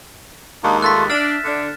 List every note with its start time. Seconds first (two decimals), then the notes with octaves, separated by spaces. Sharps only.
0.63 D#2 G#3 A#3 D4 D#4
0.82 A3 F4 A4 F#6 A6 B6
1.10 D4 E5 F6 A6 E7
1.44 D3 D4